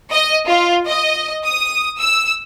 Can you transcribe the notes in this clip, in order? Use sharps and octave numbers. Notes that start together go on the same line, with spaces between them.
D#5
F4
D#5
D#6
E6